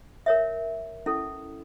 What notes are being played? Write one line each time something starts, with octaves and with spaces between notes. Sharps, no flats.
A#4 C#5 E5
C#4 E4 A4